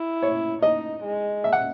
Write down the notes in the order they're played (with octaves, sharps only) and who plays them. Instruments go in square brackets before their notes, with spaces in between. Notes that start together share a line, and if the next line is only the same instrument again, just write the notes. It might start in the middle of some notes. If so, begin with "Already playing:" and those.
Already playing: [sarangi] E4
[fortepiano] C#5
[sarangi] D#4 [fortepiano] D#5
[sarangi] G#3
[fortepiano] E5
F#5